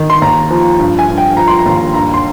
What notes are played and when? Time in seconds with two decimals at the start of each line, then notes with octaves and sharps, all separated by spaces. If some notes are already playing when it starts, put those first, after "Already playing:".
Already playing: D#3
0.10 C6
0.22 D#2 A#5
0.50 F3
0.79 G2
0.99 G#5
1.08 G2
1.18 G5
1.37 F3 A#5
1.48 C6
1.59 A#5
1.66 D#2
1.94 G2 A#5
2.14 C6